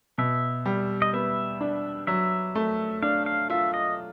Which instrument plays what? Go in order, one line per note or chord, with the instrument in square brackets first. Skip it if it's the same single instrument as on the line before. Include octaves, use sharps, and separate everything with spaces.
[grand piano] B2 [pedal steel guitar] E5
[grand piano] G3
[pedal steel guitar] D#5
[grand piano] B3 [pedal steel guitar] E5
[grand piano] D4
[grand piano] F#3 [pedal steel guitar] E5
[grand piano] A3
[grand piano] D4 [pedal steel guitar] F5
[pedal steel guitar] F5
[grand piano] F4 [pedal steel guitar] E5
[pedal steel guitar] D#5